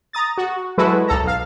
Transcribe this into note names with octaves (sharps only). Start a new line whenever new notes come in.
A#5 D#6 A6
F#4
F#3 G#3 E4 F#4 A4 B4
B1 A4 A#5
B1 F5